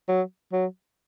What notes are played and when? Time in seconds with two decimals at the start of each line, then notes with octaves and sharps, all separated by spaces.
0.09 F#3
0.53 F#3